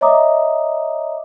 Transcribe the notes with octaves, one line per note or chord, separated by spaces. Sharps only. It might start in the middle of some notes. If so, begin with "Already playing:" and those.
C#5 D#5 E5 A#5 D6 D#6